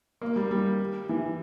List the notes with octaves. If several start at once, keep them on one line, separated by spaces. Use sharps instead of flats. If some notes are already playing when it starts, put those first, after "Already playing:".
A#3
G3
G3
E3